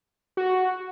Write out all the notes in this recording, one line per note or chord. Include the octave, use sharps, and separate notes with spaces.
F#4